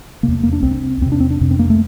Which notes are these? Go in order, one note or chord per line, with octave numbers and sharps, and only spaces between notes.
E2 C3 A#3
A#3
D4
C2 C3 C4
E2 C3 C4
D4
C4
D4
F2 C3
C4
A#3
A3